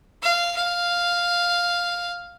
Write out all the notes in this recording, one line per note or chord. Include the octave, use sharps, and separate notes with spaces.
F5
F5